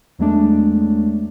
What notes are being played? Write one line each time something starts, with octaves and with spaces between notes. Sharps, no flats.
E2 F#3 G#3 A3 D4